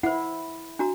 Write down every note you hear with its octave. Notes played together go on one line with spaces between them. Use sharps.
E4 C5 F#5
D4 F#4 A#5